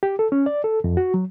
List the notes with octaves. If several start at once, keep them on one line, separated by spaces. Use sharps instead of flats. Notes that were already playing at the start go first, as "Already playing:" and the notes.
G4
A4
C#4
D5
A4
F2
F#4
F#3